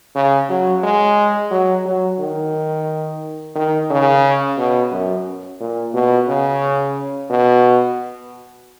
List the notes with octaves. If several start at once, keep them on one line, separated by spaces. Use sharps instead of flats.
C#3
F#3
G#3
F#3
F#3
D#3
D#3
C#3
B2
F#2
A#2
B2
C#3
B2